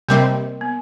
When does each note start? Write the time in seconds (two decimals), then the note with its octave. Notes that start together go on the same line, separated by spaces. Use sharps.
0.08 C3 G3 A#3 C4 A#4 D#5
0.61 B3